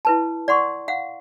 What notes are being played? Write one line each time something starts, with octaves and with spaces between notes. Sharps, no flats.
E4 B4 A5
D5 F#5 C6 C#6
F5 F#5